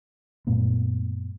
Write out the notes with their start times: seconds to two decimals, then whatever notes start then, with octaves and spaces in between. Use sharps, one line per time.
0.47 F#2 A#2 A3 B3